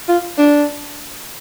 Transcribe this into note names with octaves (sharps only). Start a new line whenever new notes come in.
F4
D4